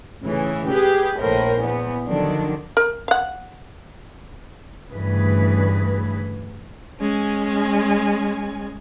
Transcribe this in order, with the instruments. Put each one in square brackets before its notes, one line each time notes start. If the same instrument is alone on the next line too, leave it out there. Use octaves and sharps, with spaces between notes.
[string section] A2 C#3 E3 C#4
G4 G#4 B4
A#1 A2 A#4 C5
E2 B3
D3 D#3 F3 F#3 D4
[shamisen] A#4
F5 F#5
[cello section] D2 G2 C#3 E3 G#4 B4
[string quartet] G#3 C#4 G#5